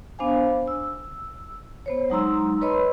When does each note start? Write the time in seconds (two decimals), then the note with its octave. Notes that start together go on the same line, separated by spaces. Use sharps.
0.19 B3 D4 C5 F5 G#5
0.68 E6
1.86 B3 C5 C#5
2.10 F#3 G#3 D#4 A#5 C6 E6
2.62 B4 C#5 D#5 B5 C6 E6